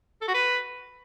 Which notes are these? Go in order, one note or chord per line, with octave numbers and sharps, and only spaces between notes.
A4
F#4
B4